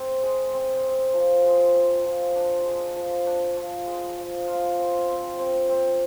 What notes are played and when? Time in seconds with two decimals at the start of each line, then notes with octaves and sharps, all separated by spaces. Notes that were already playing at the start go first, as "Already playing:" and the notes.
Already playing: C4
0.23 G#3
0.54 C4
0.84 C4
1.14 F3
1.45 G#3
1.74 C4
2.05 F3
2.36 D4
2.66 G#3
2.96 F3
3.27 D4
3.57 F3
3.87 G#3
4.17 F3
4.48 F4
4.78 C4
5.09 C4
5.39 C4
5.69 C4